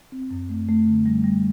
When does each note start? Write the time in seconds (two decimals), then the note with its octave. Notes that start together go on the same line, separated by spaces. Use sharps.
0.12 C4
0.31 F#2
0.49 A3
0.68 A3
0.87 D3
1.06 G3
1.24 G3